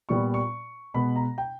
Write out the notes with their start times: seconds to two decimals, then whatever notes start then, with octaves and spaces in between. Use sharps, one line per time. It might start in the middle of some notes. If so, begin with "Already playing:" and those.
0.09 A#2 G3 B3 C#6
0.34 C#6
0.94 B2 G#3 B3 B5
1.16 A#5
1.38 G5